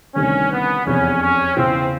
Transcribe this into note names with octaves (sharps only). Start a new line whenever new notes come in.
D2 C3 D#3 G3 C#4
B3
F1 E2 C3 C#4
C#4
E2 C#3 E3 C4